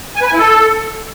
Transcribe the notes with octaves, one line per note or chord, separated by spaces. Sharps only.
G#5
B4
G#5
E4
A4